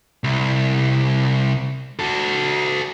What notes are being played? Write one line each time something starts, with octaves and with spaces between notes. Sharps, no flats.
C2
F#4 A4